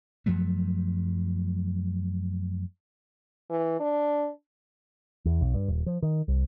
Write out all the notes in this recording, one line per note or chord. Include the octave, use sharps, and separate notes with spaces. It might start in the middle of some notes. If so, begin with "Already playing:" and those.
F#2 F3 F#3 A3
E3
D4
E2
B1
G2
D#1
F3
D#3
C2